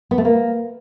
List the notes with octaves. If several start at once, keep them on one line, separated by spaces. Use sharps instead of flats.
B3
A3
A#3